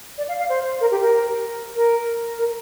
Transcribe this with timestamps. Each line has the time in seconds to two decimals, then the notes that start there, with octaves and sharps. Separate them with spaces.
0.18 D5
0.28 F5
0.39 F5
0.49 C5
0.81 A#4
0.91 G4
1.01 A#4
1.76 A#4
2.39 A#4